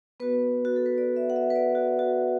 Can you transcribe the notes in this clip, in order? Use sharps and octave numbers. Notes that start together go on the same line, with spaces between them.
B3 F#4 B4
F#4
A4
B4
D5
E5
F#5
E5
B4
D5
F#4
F#4